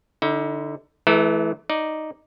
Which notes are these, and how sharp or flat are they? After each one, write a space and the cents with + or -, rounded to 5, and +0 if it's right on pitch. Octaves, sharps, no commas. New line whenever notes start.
D3 +5 D#4 +45
E3 +0 A3 -40 A#4 -25
D#4 +0 D5 +0